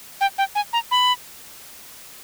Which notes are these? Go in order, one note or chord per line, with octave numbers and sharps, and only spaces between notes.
G5
G5
G#5
A#5
B5